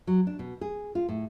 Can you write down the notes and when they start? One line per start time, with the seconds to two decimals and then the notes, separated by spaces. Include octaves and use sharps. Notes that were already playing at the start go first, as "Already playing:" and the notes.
0.07 F#3
0.27 D4
0.39 B2
0.61 G#4
0.95 F4
1.08 A2